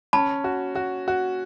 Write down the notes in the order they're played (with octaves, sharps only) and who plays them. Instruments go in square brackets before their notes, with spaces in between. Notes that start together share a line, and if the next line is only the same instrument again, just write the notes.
[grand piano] C#4 [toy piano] A5 B5
[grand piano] F#4
F#4
F#4